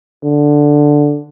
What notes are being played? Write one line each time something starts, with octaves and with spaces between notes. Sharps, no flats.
D3